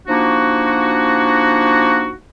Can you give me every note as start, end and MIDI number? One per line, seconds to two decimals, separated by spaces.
0.08 2.12 53
0.08 2.12 58
0.08 2.12 62
0.08 2.12 63
0.08 2.12 66